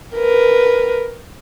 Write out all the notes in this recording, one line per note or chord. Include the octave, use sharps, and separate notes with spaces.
A#4 B4